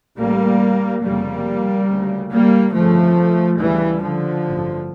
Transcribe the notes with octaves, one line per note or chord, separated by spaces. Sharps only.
A1 A2 G3 A#3
F1 F2 C#3 G3 A#3
D2 C#3
G3 A#3
G1 F2 C#3 F3 A3
D2 C#3 E3 G3
D3 F3
A1 G2